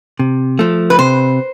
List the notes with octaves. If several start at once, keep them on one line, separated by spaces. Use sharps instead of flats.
C3
F3 A3
B4
C3 C5